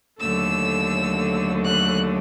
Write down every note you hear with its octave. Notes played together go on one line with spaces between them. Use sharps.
D#2 D3 F#3 A3 E6
F#6